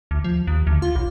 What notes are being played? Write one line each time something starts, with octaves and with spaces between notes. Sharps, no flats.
D2
F3
D#2
D2
F4
B1